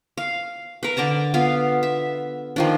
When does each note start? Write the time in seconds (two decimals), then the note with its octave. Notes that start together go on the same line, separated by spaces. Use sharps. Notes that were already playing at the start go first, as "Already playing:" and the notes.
0.17 F5
0.83 A#4 B4
0.97 D3 D5 A5 A#5
1.34 B3 F4 F5
1.83 E5
2.56 D#3 F3 D4